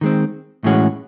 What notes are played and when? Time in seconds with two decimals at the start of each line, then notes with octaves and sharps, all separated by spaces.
0.01 D#3 G#3 C4
0.64 A2 E3 G#3 C#4 F#4